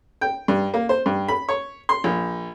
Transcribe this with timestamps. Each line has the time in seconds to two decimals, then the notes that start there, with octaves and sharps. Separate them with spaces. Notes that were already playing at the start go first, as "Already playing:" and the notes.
0.21 G5
0.48 G2
0.74 A#3
0.89 C5
1.06 G2
1.28 B5
1.49 C#5
1.89 C6
2.04 A#1